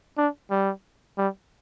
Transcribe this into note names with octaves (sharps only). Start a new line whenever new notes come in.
D4
G3
G3